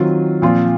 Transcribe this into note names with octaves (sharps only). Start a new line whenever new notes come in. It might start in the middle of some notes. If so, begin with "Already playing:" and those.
Already playing: D#3 F#3 C4 F4
A#2 F3 C4 F4